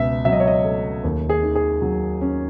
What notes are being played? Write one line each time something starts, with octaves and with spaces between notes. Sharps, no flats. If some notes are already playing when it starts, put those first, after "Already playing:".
Already playing: C#2 B2 E5
F#3 E5
D#5
C#5
D#5
A3
D#2
G#4
D#3
G#4
F#3
C#4